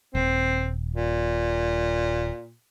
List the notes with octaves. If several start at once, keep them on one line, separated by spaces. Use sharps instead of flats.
D#1 C4
A#2